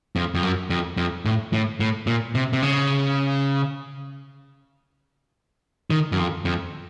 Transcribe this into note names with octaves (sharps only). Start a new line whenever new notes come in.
F2
F2
F#2
F2
F2
A2
A2
A2
A#2
C3
C3
C#3
D#3
F#2
F2
F2